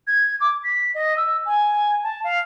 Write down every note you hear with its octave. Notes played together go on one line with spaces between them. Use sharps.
G#6
D6
B6
D#5
E6
G#5
A5
F5